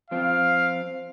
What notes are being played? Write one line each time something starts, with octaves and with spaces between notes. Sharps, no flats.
F3 C4 F4 F5